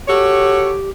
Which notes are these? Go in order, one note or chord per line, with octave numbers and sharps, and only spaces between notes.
F#4 G4 A4 C#5